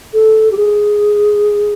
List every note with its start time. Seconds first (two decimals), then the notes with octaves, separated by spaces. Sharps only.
0.13 A4
0.51 G4
0.57 G#4